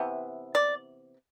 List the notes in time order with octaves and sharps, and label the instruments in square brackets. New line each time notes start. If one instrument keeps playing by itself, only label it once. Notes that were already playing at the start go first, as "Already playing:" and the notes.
Already playing: [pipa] C3 E3 B3
D5